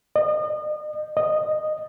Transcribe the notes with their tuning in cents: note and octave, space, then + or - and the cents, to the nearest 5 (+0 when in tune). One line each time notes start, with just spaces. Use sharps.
D#5 -35
D#5 -10